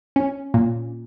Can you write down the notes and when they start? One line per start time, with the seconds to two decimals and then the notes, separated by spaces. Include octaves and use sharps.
0.16 C#4
0.54 A#2